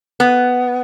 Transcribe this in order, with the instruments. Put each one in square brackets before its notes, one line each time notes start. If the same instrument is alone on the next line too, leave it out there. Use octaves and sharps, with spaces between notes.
[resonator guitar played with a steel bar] B3